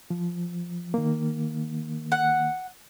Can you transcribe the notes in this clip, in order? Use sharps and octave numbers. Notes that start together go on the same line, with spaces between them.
F3
D#3 A#3
F#5